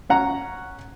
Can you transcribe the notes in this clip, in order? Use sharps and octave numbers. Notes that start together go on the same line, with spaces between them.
C#4 F#5 A#5